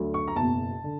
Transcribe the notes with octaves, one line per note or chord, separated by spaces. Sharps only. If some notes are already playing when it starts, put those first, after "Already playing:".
Already playing: D2 D3 F#3
C#6
A#5
F#1 E2 B2 A5
D3